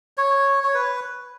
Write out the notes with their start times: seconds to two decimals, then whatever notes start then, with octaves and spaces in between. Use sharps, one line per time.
0.17 C#5
0.64 C#5
0.74 B4